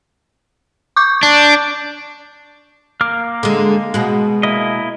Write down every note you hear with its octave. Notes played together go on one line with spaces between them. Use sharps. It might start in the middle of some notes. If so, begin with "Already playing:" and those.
C#6 D6 G6
D4
A#3 D6 F6
D3 G#3
B2 G#3
A#3 E4 D#5